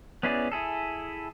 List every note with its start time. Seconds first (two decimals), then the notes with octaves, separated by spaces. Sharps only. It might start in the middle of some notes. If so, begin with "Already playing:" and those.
0.23 B3 C#4 E4 G#4 D5
0.52 E4 G#4 A4